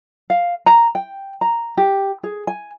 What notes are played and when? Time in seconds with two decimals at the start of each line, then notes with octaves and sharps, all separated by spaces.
0.30 F5
0.66 A#5
0.95 G5
1.41 A#5
1.77 G4
2.23 G#4
2.47 G#5